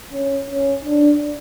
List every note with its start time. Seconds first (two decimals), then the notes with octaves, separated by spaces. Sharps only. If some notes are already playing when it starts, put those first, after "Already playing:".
0.13 C#4
0.48 C#4
0.84 D4